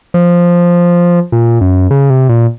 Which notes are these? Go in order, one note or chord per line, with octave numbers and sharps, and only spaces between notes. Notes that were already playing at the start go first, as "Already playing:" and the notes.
F3
A#2
F#2
C#3
C3
A#2